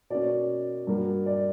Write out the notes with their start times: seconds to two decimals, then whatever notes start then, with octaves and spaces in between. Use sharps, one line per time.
0.10 B2 A#3 C#4 D5
0.87 G2 F#3 A#3
1.26 D5